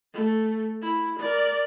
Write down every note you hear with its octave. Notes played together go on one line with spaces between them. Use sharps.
A3
E4
A#4 D5